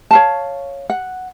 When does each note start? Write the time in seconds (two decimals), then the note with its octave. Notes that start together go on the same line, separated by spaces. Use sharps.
0.11 C#5 F5 A5
0.90 F#5